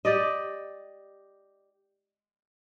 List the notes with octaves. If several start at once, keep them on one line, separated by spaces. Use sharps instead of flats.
G4 D5 D#5